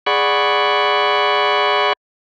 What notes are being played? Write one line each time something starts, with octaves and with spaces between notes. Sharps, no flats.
G#4 D5 F#5 B5 C#6